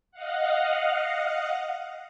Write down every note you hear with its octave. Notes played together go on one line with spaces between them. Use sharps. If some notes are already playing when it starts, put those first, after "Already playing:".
D#5 F5 F#5